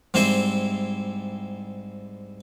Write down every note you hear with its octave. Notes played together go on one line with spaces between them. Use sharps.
G#2 G3 C4 E4 C5